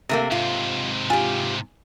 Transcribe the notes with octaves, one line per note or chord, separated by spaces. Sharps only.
C3 A3 A#3
G#2 C3 F4
F4 G4 G#5